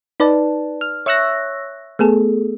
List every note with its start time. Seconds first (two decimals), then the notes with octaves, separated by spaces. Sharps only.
0.20 D#4 B4 D5 A5
0.81 F6
1.06 C#5 E5 C#6 E6 F#6 A#6
1.99 A3 B3 G#4 A4